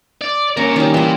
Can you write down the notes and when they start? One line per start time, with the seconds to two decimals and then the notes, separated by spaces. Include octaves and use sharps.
0.22 D5
0.57 A#3 C#4 A#4 C#5
0.76 D#3 G3 C#4
0.94 E3 A#3 A5 C6